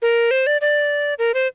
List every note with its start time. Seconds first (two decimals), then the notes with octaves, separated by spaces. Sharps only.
0.02 A#4
0.31 C5
0.47 D5
0.61 D5
1.19 A#4
1.34 C5